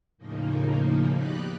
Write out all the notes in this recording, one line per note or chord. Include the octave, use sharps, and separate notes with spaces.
D#2 A2 C#3 F3 A#3 D#4
B2 D#4 G4 D5 B5 F#6